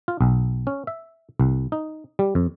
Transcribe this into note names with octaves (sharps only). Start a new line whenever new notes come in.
F4
B1
C#4
E5
C2
D#4
G3
F2